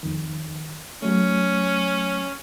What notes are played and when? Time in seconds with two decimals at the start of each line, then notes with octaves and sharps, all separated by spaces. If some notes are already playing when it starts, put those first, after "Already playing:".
0.03 F2 D#3
1.02 F#3 A3 C#4